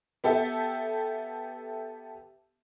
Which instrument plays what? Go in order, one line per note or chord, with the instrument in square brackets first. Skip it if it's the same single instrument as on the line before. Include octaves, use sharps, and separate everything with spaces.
[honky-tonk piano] B3 G4 A4 E5